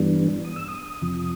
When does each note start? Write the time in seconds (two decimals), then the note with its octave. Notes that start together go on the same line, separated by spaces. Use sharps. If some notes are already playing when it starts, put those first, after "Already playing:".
Already playing: G2 E3 G3 B3 D4
0.45 D#6
0.56 E6
0.68 D#6
1.02 F2 C3 F3